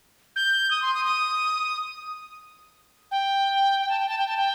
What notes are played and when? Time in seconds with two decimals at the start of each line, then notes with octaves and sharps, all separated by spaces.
0.36 G6
0.71 D#6
0.82 C6
0.94 D#6
1.05 D#6
3.11 G5
3.80 G5
3.89 A5
3.99 G5
4.09 A5
4.18 G5
4.28 A5
4.37 G5